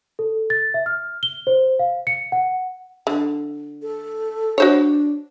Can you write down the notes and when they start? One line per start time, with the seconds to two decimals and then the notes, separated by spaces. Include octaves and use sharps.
0.19 A4
0.50 A6
0.74 E5
0.86 F6
1.23 G7
1.47 C5
1.79 F5
2.07 C#7
2.32 F#5
3.07 D3
3.82 A4
4.58 D4 F#4 C5 C#5